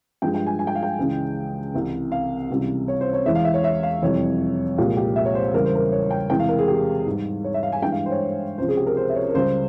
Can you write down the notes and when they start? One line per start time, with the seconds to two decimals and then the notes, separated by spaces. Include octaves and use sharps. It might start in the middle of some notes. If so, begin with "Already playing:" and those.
0.22 G2 F3 G#3 G5
0.34 G5
0.46 G#5
0.59 G#5
0.67 G5
0.75 F5
0.83 G5
0.98 C#2 C#3 E3 G#3
1.74 C2 C3 E3
2.12 F5
2.50 C#2 C3 E3 G3
2.88 C#5
3.01 C5
3.13 C#5
3.26 E2 E3 G#3 E5
3.35 F5
3.45 E5
3.54 C#5
3.64 E5
3.83 F5
4.02 F2 C3 E3 G3 C#5
4.78 C2 A#2 F3 G#3 G4
4.97 G4
5.16 E5
5.25 C#5
5.35 C5
5.54 E2 C#3 G3 A#4
5.66 C5
5.75 A#4
5.92 C#5
6.11 G5
6.30 E2 C3 E3 G#3 G5
6.40 F5
6.49 A#4
6.58 G#4
6.68 G4
7.06 G#2 G3
7.44 C#5
7.54 E5
7.63 F5
7.72 G#5
7.82 G2 E3 G#3 G5
7.92 F5
8.06 C5
8.11 C#5
8.58 C#2 C3 F3 C5
8.68 G#4
8.77 G4
8.86 A#4
8.97 C5
9.09 E5
9.15 C#5
9.29 A#4
9.34 C#2 C#3 G3 C5